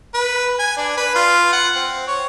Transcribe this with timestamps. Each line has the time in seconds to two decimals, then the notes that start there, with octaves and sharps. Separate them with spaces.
0.14 B4
0.59 G#5
0.77 D4
0.97 B4
1.15 F4
1.53 F#5
1.75 C4
2.07 C#5